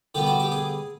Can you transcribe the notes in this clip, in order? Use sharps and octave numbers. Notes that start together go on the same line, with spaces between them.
D3 G3 B3 G4
F#4
G4
G#4